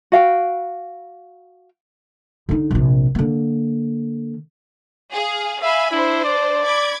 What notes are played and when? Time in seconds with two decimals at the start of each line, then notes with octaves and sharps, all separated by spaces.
0.12 F#4 F5 G5
2.49 D3 D#4
2.71 A#1 C3
3.15 D3 A#3
5.13 G#4 F5
5.62 E5 F5 G#5 B5
5.91 D4 E4 C5
6.25 D5
6.63 B5 D6 G#6